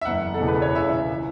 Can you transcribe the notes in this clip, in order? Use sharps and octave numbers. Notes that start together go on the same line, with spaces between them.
E5
F#1 E2 E3 F#5
A4
E1 E2 C#3 E3
B4
C#5
C#2 C#3 E3 E5
E3